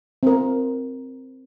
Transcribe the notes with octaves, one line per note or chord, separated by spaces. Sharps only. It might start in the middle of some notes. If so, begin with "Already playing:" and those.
C4 A#4